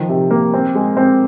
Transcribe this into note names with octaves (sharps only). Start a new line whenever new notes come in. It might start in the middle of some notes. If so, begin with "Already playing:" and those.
Already playing: D#3 F3
C3
A#3
C4
G#3
C4